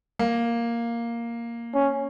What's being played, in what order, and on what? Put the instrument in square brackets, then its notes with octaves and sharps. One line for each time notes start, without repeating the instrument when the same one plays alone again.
[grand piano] A#3
[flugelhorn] C#4